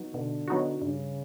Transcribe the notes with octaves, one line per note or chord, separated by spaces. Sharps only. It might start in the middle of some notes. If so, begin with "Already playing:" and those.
Already playing: F#3 B3 D#4 F#4
B2 D3
F#3 B3 D#4 F#4
G2 C#3